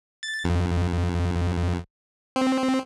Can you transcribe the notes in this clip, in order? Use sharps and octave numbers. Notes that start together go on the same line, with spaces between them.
A6
F2
C4